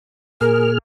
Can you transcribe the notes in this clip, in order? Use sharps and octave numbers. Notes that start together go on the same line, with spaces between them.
A#2 G#4 A#4 F6